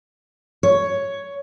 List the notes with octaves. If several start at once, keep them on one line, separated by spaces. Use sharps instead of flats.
C#5